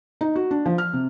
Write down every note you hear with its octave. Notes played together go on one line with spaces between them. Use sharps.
D#4
F#4
D4
F3
F6
C3